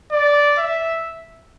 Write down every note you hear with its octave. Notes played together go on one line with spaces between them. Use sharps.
D5
E5